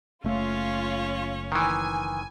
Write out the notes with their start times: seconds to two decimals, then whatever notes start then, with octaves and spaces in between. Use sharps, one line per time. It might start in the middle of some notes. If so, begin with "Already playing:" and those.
0.24 F#1 A3 C#4 F4 C#5
1.52 D#3 E3 G#5